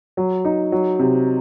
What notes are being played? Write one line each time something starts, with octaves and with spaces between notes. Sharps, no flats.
F#3
D#4
F#3
C3